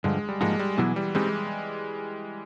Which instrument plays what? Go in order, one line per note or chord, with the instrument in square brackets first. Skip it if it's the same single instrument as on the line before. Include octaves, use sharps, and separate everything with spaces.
[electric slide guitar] G2 D3 F3 [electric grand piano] G#3
[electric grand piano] G3
[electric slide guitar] G#2 F3 A#3 D#4 F#4 [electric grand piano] G#3
[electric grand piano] G3
[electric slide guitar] B2 F#3 B3 E4 G#4 [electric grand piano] E3
[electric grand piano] G3
[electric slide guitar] G3 C4 D#4 [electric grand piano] G#3